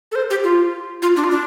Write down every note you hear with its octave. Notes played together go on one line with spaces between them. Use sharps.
A4
C5
G4
F4
F4
D4
F4
D4